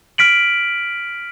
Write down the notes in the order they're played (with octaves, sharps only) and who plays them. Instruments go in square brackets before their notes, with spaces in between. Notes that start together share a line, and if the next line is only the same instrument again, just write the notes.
[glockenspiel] F6 B6 D7 F#7